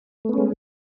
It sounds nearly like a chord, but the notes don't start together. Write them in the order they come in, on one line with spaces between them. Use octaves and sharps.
A3 B3 C#4 G#3